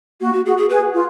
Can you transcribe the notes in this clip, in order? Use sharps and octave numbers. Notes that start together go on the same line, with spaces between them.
A#3 F#4
F#4
F#4 G#4
G#4
G#4 B4
F4